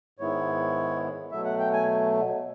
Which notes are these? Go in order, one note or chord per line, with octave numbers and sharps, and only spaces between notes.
G#2 D#3 G#3 B3 E4 C#5
B2 F#3 A3 E5
F#5
G5
G#5